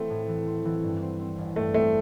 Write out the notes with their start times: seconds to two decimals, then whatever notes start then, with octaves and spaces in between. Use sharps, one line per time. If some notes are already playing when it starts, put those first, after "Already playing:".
Already playing: E3 A3 C4
0.10 A2
0.29 E3
0.47 C4
0.65 E3
0.83 G2
1.02 C4
1.20 C4
1.38 A1
1.56 G2 A3
1.74 A3 C4